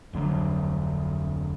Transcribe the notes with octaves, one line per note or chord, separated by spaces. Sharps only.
F1 D2 D3 F#3